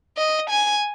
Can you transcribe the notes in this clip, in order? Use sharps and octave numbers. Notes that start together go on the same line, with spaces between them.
D#5
G#5